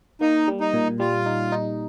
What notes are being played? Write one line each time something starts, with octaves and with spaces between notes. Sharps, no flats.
A#3 D#4
G3
D#4
A#2
G3 F4
D#4
D#4